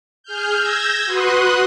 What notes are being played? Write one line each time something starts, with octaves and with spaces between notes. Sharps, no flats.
G#4 F6 G6
E6 G6 G#6 A#6
F#4 B4 C6 D#6 F#6